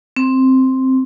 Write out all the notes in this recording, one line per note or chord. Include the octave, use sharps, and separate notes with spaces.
C4